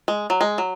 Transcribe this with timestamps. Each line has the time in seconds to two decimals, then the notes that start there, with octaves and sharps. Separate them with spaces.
0.08 G#3
0.30 F#3
0.41 G#3
0.58 F#3